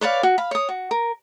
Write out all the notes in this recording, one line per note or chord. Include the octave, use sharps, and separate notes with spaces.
B4 C#5 D5 F5
F#4
F5 B5
C#5 D#6
F#4
A#4